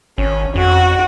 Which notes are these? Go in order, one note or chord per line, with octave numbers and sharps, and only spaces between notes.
G#1 C#4
F2 F#4